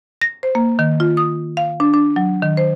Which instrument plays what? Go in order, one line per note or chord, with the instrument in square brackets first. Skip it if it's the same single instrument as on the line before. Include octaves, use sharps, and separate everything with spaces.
[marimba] A#6
C5
A#3
D#3
F4
D#6
F5
D4
D4
F#3
D#3
C5